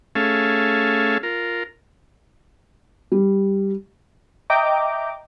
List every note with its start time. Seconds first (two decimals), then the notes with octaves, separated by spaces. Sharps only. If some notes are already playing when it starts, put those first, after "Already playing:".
0.15 A3 C#4 G#4 A4 E5 F5
1.23 F4 A#4
3.12 G3
4.50 D#5 E5 G5 A#5 D6